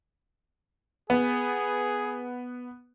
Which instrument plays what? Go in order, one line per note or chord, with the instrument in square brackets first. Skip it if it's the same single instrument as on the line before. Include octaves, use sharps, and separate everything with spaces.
[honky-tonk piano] B3 [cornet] G#4